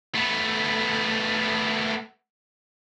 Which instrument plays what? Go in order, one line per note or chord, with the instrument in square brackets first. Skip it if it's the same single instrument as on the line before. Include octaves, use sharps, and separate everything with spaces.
[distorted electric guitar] A3 B3